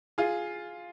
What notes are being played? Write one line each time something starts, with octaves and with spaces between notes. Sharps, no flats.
F4 G#4